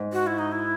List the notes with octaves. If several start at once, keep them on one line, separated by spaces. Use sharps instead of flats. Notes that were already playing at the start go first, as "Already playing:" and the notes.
Already playing: G#2
F#4
E4
D#4
E4